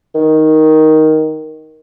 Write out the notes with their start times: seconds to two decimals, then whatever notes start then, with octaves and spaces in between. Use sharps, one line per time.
0.15 D#3